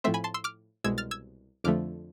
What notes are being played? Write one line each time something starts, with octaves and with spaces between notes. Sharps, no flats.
A2 F3 A3 C4 C5 E5
G#5 B5
A5 C6
C6 E6
D6 F6
C2 B2 G#3 E6 G#6
F6 A6
E6 G#6
F2 D3 F3 A3 D6 F6